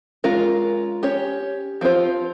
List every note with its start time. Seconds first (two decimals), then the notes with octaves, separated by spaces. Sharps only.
0.24 G#3 C#4 F4 A#4
1.03 C#4 G4 C#5
1.81 F3 C4 F4 C5